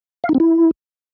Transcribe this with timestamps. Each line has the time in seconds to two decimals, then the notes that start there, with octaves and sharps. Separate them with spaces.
0.24 F5
0.29 D#4
0.35 C4
0.40 E4